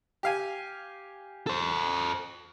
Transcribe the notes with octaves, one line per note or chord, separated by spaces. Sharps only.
G4 F5 G#5
A4 C5